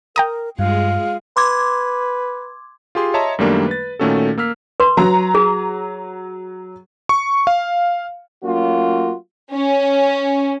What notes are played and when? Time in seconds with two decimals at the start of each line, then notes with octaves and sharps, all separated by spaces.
0.16 A#4 G5 A#5 D#6
0.59 G2 G#3 F4 G#4 F5
1.37 B4 C6 D6 G#6
2.95 F4 G4 G#4 C6
3.14 C#5 D#5 E5 A5 A#5 C6
3.39 F#2 D#3 G3 A3 A#3 D4
3.68 B4 A6
3.99 A#2 D#3 A3 C#4 F#4 A4
4.38 A#3 E6 F6 B6
4.80 B4 C6
4.97 F#3 A#5
5.35 G#4
7.09 C#6
7.47 F5
8.43 F#3 A3 A#3 C#4 F4 F#4
9.52 C#4